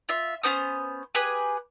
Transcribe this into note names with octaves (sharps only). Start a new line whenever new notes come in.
F4 E5
B3 C#4 C5 D#6
G4 G#4 B4 G#5